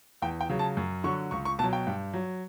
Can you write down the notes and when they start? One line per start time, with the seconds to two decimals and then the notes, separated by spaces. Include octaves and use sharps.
0.22 E2 G5
0.41 G5
0.50 C#3 F#3
0.59 A5
0.77 F#2
1.04 D3 F#3 C#6
1.31 C#2 C#6
1.45 C#6
1.59 B2 A5
1.63 F#3
1.73 G5
1.87 G2
2.13 F#3